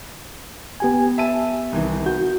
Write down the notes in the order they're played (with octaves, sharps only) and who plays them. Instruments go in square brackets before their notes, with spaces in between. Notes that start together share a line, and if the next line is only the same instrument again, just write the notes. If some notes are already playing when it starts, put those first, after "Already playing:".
[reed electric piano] B3 G4 G#5
[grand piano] E5 A5 D#7
C2 D#3 E3
[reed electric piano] F#4 [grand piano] G6